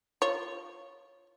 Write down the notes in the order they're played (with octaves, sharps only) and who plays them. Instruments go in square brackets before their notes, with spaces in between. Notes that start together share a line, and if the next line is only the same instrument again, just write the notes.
[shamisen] F4 C#5